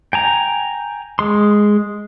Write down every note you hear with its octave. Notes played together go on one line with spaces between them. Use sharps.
G5 G#5 A#5
G#3 C6